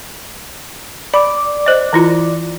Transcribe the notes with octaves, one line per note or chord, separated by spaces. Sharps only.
D5 B5 D6
C5 D#5
E3 E4 F4